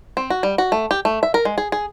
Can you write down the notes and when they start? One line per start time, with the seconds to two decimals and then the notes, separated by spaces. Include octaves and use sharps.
0.17 C4
0.30 F#4
0.43 G3
0.58 F#4
0.72 A3
0.91 G4
1.05 A3
1.23 E5
1.34 A#4
1.45 G#3
1.58 G#4
1.72 G#4